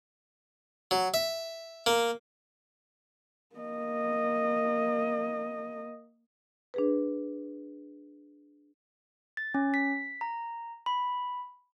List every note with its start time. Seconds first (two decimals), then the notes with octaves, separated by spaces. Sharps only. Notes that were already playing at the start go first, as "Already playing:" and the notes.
0.91 F#3
1.14 E5
1.86 A#3
3.56 A#3 D#5
6.74 D4 G#4 B4
9.37 A6
9.54 C#4
9.74 B6
10.21 A#5
10.86 B5